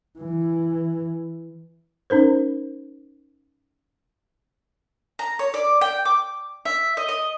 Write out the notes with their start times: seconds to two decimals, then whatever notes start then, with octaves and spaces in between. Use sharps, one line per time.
0.19 E3
2.10 C#4 D#4 A#4 C5
5.19 A#5
5.39 C#5
5.54 D5
5.81 G5
6.05 D6
6.65 E5
6.97 D#5
7.09 D#5